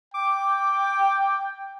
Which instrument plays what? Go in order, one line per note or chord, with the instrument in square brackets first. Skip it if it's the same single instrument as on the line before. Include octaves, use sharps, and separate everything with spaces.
[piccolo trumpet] G5 [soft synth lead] D6